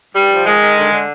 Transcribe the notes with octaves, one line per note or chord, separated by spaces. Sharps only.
G2 G3
F3
D#3 G#3
D#3
D3
D3